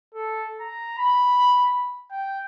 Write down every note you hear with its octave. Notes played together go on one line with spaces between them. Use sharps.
A4
A#5
B5
G5